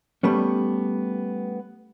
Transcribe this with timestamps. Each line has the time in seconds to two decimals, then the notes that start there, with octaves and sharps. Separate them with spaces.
0.23 G3 A3 B3 C#4